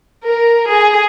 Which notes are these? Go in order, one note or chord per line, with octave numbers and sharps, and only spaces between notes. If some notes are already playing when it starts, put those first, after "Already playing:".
A#4
G#4